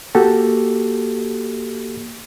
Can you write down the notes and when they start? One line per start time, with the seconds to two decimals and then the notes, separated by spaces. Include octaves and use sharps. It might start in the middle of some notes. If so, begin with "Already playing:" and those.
0.15 A#3 F#4 G4 A4